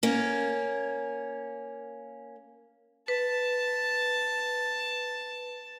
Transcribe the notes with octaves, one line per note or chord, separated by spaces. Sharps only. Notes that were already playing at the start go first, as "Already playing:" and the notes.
A#3 C#4
B4 A5